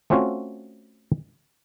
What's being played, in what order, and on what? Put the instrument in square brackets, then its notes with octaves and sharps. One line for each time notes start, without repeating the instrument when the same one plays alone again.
[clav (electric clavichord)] A3 C4 C#4 F4 F#4